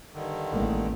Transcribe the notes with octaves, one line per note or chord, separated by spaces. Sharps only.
G2 D3 D#3
A1 G3 G#3 A#3